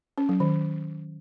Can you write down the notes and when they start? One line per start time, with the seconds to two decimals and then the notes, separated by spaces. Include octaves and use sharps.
0.18 C#4
0.29 F#3
0.40 D#3